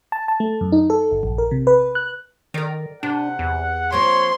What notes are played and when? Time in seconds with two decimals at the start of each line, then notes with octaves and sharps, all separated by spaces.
0.12 A5
0.28 A5
0.40 A3
0.61 F#2
0.72 D#4
0.90 A4
1.11 G1
1.23 A#1
1.38 A#4
1.51 C3
1.67 B4
1.95 F#6
2.54 D#3 A#4 D5
3.03 C3 D4 F#5
3.39 E2
3.92 F3 A#3 C4 C#5 C6